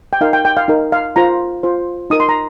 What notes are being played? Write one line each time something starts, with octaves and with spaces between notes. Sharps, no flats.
G5
D#4 A#4 F5
G5
G5
F5
D#4 A#4
F5
F4 C5 A#5
F4 C5
D#4 A#4 D#6
C6
A#5